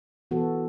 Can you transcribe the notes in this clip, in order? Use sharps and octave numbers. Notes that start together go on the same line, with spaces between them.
E3 B3 F#4 A4